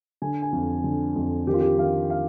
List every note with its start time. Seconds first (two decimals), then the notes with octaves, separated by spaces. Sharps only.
0.22 D3 G#5
0.42 G#5
0.52 F2
0.84 D3
1.16 F2
1.47 D#3 G4
1.54 F4
1.60 G4
1.78 D#3 F5
2.10 F5